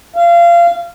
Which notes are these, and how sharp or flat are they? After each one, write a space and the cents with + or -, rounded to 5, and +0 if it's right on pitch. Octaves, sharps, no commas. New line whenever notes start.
F5 -25